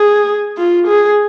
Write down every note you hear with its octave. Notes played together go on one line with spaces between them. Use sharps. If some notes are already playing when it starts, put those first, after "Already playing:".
Already playing: G#4
F4
G#4